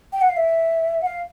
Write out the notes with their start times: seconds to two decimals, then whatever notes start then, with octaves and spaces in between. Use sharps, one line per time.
0.13 G5
0.21 F#5
0.29 F5
0.37 E5
1.02 F#5
1.06 F5